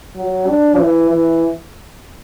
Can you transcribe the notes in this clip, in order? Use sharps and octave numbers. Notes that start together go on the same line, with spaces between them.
F#3
D4
E3
E3